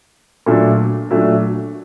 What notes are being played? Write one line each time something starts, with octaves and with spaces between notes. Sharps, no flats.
A#2 F#3 A3 D4
A#2 F#3 A3 D4